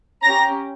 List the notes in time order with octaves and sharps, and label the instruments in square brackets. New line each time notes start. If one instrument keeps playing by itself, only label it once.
[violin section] C#4 G4 A#5 A#6